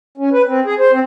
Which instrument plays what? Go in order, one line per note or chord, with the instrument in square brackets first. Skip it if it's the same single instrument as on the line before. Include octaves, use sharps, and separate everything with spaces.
[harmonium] C#4
B4
C4
G#4
C5
C4